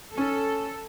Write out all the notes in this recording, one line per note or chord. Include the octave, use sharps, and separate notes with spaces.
C#4 A4